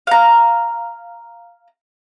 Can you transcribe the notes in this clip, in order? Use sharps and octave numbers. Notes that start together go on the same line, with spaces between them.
F5 A#5